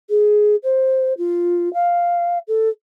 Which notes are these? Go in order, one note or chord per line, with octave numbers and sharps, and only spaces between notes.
G#4
C5
F4
F5
A4